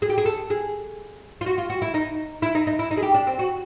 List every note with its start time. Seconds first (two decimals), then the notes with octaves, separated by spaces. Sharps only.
0.02 G#4
0.10 G4
0.18 G#4
0.26 A4
0.50 G#4
1.41 F4
1.46 F#4
1.58 F4
1.70 F#4
1.82 E4
1.94 D#4
2.42 E4
2.55 D#4
2.67 D#4
2.79 E4
2.91 D#4
2.97 G#4
3.02 G4
3.14 D4
3.27 C4
3.39 F#4